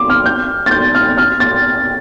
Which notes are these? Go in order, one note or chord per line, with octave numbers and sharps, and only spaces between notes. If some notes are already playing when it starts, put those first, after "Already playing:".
Already playing: D6
F6
G6
A6
G6
F6
F6
A6